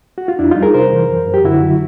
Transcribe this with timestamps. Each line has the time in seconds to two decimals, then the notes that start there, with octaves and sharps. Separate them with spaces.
0.18 F#4
0.28 F4
0.39 F2 D4 E4
0.51 G3 D#4 F4
0.62 G#4 A#4
0.74 C3 A#4 C5
0.91 E3
1.09 F#2
1.28 F#2
1.34 G4
1.44 D3 E4 F#4
1.63 F#3